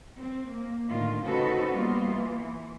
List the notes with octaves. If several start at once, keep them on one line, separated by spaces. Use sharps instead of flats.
C4
A#3
A2 D3 D#3 F4
C#3 C4 D#4 F#4 A4 B4
G3 A#3 B3 F4
E3